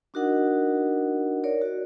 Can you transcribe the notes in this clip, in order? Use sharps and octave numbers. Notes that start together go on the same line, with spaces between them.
D4 D#4 F#4 A#4 D#5 F#5
A#4 C#5 D5
F#4